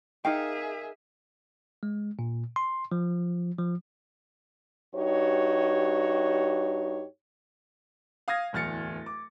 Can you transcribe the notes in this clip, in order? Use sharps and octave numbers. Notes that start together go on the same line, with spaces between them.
D#4 G#4 A#4 E5 F5 G5
G#3
A#2
C6
F3
F3
G2 D#4 F#4 G4 C#5
F5 D#6 G#6 A#6
D1 E2 F6 A6 C#7
D6